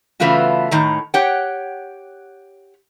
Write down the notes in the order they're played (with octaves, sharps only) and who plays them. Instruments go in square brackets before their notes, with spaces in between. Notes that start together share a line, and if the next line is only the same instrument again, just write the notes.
[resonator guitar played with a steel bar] C#3 E3 A3 B3 F4 F#4
A2 D#3 A#5
G4 C#5 F#5 G5